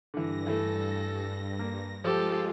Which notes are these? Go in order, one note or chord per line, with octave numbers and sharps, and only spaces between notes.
G2 D3 E3 A#6
E3 A3 A4
A#3
F3 G#3 F4 G4 A4